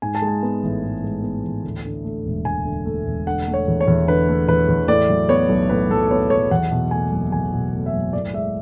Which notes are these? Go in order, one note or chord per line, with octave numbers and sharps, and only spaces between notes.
G#2 G#5
A5
G#3
G#5
B3
A1
G#2
G#3
B3
A1
D2
D3
A3
E1
D2 G#5
D3
A3
E1
D3 F#5
A3
C#5
E2
C#5
E2
D3 B4
A3
E2 B4
E2
A2 D5
F#3
B3 C#5
B1
A2 B4
F#3 A4
B3 C#5
B1 C#5
E2 F#5
B2
A3 G#5
F#1
E2 G#5
B2
A3
E5
F#1
A2 D5
G#3 E5